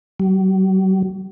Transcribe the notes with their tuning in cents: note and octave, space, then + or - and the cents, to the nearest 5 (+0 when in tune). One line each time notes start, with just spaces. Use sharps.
F#3 +45